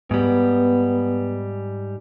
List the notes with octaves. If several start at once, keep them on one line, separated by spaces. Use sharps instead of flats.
G#2 G3 B3